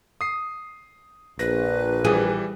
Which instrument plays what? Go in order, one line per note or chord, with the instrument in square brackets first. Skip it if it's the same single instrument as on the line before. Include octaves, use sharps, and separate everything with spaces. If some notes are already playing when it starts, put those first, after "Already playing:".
[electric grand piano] D#6 C7
[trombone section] A#1 [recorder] B4 [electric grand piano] A#6
[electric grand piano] E3 G3 [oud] G#4